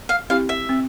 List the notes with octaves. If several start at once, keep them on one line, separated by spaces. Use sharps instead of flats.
F5
C4 E4 G4 F5
E5
C4